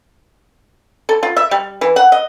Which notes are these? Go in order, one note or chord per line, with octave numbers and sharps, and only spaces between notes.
A4
F4
E5
G3
E3
F#5
D#5